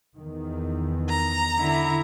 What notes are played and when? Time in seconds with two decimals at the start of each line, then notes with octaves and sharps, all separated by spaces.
0.15 E2 D#3
1.09 A#5
1.60 D3 E4